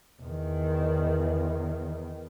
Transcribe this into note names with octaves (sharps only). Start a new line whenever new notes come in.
E2 D#3